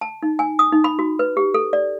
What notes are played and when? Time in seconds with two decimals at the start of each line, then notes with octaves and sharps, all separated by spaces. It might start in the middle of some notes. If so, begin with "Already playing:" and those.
0.01 A5
0.23 D#4
0.39 G#5
0.59 D#6
0.72 D#4
0.84 B5
0.99 F#4
1.19 B4
1.37 G4
1.54 A4
1.73 D5